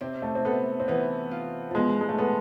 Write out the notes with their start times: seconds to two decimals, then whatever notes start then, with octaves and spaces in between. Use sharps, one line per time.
0.01 C3 C4
0.22 A3
0.35 C4
0.45 B3 A4
0.80 C4
0.88 E3 B3
1.31 F4
1.71 F3
1.75 B2 G#3
2.01 G#3
2.09 A3
2.18 B3 A4